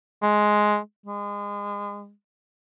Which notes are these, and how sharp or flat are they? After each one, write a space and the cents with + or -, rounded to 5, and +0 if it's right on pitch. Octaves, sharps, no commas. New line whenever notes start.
G#3 +10
G#3 -30